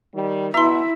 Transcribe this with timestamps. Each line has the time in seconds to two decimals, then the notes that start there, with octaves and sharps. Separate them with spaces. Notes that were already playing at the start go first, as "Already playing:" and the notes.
0.15 D#3 G3
0.54 B2 E4 E5 A#5 C6